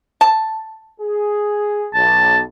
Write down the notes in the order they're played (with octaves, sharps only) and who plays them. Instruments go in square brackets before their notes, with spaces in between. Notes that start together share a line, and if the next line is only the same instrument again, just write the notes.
[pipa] A5
[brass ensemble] G#4
[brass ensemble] B1 [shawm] A5